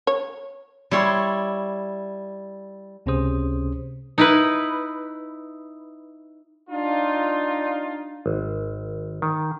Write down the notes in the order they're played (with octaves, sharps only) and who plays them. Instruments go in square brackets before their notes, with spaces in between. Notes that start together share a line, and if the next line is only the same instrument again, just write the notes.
[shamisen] C#5
[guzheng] G3 E4 C#5 C6
[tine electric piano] C#2 C3 C#4 G#4 C5 D#6
[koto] D#4 E4 B4
[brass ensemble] D4 D#4 F4
[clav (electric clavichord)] G#1
D#3